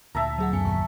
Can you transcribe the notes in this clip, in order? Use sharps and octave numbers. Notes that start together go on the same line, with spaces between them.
D2 A#2 E5 A5 A#5
F#3 G#4 F#5
F#2 B3 G#5 C#7
A#1 D#2 C#3 C#6 B6